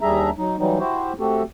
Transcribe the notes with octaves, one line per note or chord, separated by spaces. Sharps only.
D#2 G3 D4 G#4 E5 A#5
F#3 D#4
E3 F#3 G3 D#4
E4 F#4 G4 C5
A3 C4 F#4 G4 A4